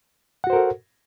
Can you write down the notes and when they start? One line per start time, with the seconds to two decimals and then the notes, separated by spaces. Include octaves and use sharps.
0.44 F#5
0.47 F#4
0.50 C5
0.53 A#4
0.56 A4